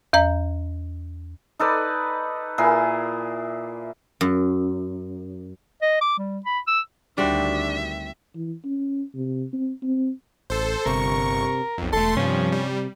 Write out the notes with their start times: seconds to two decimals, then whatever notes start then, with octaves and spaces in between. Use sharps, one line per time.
0.13 E2 D#5 A#5
1.59 D#4 A4 B4 D5
2.58 A#2 E4 G#4 A#4
4.21 F#2
5.82 D#5
6.01 D6
6.18 G3
6.45 B5
6.67 E6
7.18 D2 D#3 G3 C4 D4 F#4 E5
8.35 E3
8.65 C#4
9.14 C3
9.53 C4
9.83 C4
10.50 A1 A4 C5
10.86 G1 C3 A#4 C#6
11.78 B1 F2
11.93 E1 A3 A4 C6
12.17 G2 C3 F3 C#4
12.52 G3